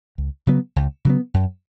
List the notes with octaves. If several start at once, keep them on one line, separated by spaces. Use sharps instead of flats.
C#2
C#3 F#3 B3
C#2
C#3 F#3 B3
F#2